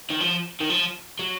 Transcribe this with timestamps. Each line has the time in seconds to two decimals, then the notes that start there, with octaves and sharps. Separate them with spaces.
0.10 D#3
0.20 F3
0.60 D#3
0.70 F3
1.19 F#3